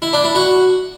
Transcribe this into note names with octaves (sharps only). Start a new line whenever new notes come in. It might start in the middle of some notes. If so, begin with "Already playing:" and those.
E4
D4
E4
F#4